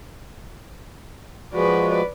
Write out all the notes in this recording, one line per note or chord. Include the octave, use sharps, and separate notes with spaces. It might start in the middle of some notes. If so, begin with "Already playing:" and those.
F3 G#3 F#4 B4 D5